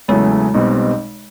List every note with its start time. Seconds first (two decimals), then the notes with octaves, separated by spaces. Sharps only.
0.08 E2 C#3 F#3 G#3 A3
0.54 B1 B2 G3 C4